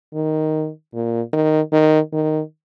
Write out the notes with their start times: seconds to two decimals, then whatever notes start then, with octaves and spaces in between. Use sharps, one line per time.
0.14 D#3
0.94 A#2
1.33 D#3
1.72 D#3
2.13 D#3